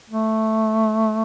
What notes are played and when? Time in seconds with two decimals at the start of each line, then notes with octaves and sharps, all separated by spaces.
0.10 A3